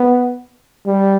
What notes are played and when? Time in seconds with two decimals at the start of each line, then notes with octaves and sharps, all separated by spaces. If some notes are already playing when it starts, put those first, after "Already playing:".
Already playing: B3
0.86 G3